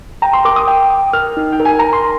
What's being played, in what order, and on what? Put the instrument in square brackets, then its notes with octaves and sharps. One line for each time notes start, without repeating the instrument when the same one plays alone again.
[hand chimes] G5 [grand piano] A#5
[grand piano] C6
[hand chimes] A#4 [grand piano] D6
[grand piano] D#6
[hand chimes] G5
G5
[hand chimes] A#4 [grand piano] F6
[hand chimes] D#4
[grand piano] G5
[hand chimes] A#4
[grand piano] G#5
[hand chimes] A#4 [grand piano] A#5
[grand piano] C6